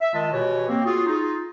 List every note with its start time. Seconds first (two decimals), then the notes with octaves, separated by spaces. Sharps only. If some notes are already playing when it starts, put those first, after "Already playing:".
0.01 E5
0.14 D#3 G#3 F4 D#5 A5
0.33 B2 E3 G4 B4 C#5
0.69 A#3 C4
0.85 F4 F#4 G#4
1.07 D#4 F4 G#4